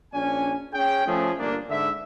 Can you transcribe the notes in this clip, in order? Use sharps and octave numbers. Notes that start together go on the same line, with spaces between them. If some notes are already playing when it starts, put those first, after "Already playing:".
A#1 C#4 D4 G#5
C#4 G#4 G5
F3 A3 C#4 G#4
G1 A#3 D4
G#2 D3 E5